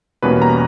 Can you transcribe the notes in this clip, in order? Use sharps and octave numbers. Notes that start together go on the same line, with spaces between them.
E2 B2 G3 A#3 C#4 B4
A#5